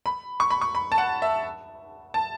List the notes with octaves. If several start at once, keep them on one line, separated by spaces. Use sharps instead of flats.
B5
C#6
B5
C#6
B5
A5
F#5
E5
A5